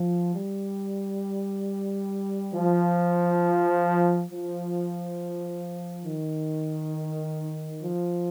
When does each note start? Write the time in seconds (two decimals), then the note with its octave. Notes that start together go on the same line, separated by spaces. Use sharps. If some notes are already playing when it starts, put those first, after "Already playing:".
Already playing: F3
0.35 G3
2.54 F3
4.30 F3
6.06 D#3
7.83 F3